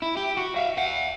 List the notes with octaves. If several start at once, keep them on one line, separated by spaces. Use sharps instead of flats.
E4
G4
F#4
E5 F5
E5 F#5